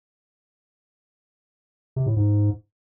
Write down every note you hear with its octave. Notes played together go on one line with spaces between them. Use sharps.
C3
A2
G#2